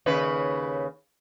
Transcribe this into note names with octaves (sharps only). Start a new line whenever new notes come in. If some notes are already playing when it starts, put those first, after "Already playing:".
D#2 C#3 B4